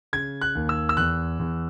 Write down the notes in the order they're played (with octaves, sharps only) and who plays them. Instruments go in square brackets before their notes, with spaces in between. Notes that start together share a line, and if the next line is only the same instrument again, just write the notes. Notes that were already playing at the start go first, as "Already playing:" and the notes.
[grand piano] C#3 G#6
F#6
D#2
E6
E6
E2 F#6
E2